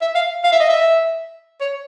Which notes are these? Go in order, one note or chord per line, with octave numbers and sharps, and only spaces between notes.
E5
F5
F5
E5
D#5
E5
C#5